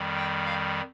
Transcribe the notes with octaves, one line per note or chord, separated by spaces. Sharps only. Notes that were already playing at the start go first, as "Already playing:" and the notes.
Already playing: F2 D#3 G3
G5
F5